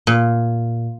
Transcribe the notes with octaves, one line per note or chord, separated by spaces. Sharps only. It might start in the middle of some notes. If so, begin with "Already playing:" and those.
A#2